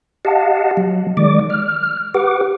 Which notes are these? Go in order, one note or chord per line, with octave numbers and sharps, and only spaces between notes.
G4 D#5 F5 F#5 A5
F#3
D#3 G#3 D5 D6
F6
G4 B4 F#5 D6